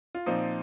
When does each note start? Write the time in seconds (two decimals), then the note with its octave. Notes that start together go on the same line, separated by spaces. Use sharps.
0.15 F4
0.26 A#2 F3 C4 D#4